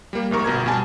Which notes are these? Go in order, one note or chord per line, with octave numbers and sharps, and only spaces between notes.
G3 A#3
A#1 G#2 A#4 C#6
G1 B2 A#5 G#6
B2 G3 G#5 A5